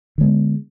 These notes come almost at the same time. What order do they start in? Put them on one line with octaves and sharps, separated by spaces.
D3 G#3 B3